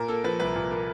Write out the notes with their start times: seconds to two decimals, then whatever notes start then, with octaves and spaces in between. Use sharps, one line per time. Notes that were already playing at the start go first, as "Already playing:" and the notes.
Already playing: A#2 A#4
0.08 A#3 A4
0.24 F3 B4
0.40 C2 B4
0.56 A#2
0.71 A#3